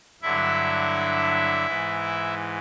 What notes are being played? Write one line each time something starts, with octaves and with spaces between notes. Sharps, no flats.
G2 D3 F#3 E4 E5
G#2 E3